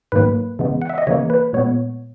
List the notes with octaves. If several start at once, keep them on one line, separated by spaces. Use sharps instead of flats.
G#2 D#3 F#3 A#3 B4
C#3 E3 G#3 B3
F#5
E5
D#5
C#3 E3 A#3 C#5
B4
A#2 G#3 B3 C#5